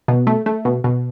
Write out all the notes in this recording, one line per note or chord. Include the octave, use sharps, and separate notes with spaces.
B2
A3
A3
B2
B2